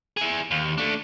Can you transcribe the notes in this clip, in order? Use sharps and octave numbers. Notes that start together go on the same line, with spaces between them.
E4 G#4
D#2
A3 D4